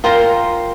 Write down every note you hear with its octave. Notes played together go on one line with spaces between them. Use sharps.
F4 A#4 C5 G5 A#5